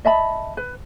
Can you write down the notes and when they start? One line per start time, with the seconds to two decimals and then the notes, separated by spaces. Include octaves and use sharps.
0.05 D#5 E5 A5 B5
0.57 B4